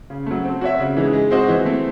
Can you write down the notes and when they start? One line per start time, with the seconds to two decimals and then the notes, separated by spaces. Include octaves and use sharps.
0.10 C#3
0.26 F#3 A3
0.44 C4
0.61 F#4 C#5 E5
0.79 C#3
0.96 E3 G#3 D#4
1.13 G#3
1.31 C4 F#4 C5 D#5
1.48 E3
1.65 A3 C4